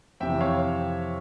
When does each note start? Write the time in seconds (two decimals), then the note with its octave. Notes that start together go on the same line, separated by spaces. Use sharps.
0.20 F2 C3 E3 E5 G5
0.41 C#5 F5